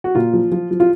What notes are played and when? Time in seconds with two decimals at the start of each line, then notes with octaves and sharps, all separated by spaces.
0.04 F#4
0.15 A#2 F4
0.33 F3
0.52 F3
0.71 F3
0.80 F4